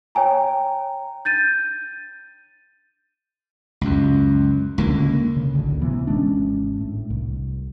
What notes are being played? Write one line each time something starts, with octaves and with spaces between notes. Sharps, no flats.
C#5 G5 G#5 A#5
G6 A6 D#7
C#2 F#2
C#2 D3 A#3
C#3
A1 D2
C3 E3 B3
G#1 G#3 C#4 D4
A2
C2